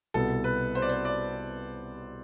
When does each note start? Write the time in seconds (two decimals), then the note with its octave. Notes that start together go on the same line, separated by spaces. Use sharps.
0.14 C2 B2 B3 A4
0.44 B4
0.75 C5
0.82 D5
0.89 C5
1.05 D5